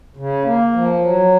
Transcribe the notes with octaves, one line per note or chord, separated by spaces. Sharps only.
C#3
A#3
F3
F#3